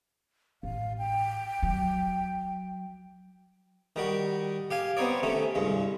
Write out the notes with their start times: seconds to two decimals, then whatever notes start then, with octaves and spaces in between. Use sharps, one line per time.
0.63 A1 F5
0.98 G5
1.63 F#3
3.96 D#3 G3 F#4
4.71 G4 F5 G#5
4.97 B3 C4 D#4 C#5 D5
5.23 C3 A3 C#4
5.55 C2 G2 G#3